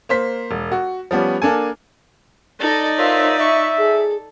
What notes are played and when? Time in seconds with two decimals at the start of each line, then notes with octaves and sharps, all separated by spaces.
0.09 A#3 C5 B6
0.51 E1
0.72 F#4
1.11 F3 G3 B3 C#4
1.42 A#3 D4 A4 G#5
2.60 D#4 A4 D5 D#5
2.98 F4 A#4 C5 C#5 E5
3.39 E5 C#6
3.78 G#4 A4